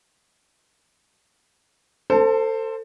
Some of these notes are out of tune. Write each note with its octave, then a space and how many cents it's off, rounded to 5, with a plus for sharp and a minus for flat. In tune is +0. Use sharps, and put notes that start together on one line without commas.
A4 +30 C5 +0 A5 +0